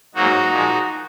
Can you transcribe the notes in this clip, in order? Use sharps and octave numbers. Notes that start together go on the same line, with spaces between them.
G#2 F#3 A#3 D#4 F#4
A#2 F3 G#3